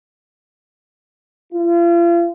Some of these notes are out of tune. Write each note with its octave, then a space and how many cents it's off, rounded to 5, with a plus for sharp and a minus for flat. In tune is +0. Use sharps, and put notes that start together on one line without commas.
F4 -40